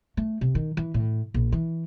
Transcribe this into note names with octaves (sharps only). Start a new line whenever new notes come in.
A3
C3
D#3
E3
A2
A#1
E3